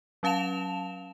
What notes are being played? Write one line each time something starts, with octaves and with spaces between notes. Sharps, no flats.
F#3 C#4 F5 A5 E7 F7